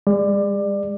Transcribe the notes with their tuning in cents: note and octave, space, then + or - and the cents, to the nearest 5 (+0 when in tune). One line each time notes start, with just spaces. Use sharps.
G#3 -40 D5 +20